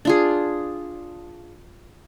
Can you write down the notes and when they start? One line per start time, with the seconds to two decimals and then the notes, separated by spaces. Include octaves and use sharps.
0.05 D4 F4 G#4